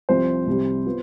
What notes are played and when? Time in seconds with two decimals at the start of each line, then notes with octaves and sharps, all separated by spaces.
0.09 C2 C3 F3 C4 C5
0.47 C2 C3 G3
0.86 B3 F4